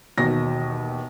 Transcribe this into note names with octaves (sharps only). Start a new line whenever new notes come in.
E1 D#2 B2 A#6